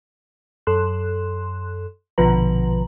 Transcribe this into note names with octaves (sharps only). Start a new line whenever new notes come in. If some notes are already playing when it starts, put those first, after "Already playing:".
F#2 A4 C6 F#6
A#1 B2 D3 F3 B4 A#5